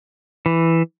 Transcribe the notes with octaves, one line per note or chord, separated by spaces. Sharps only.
E3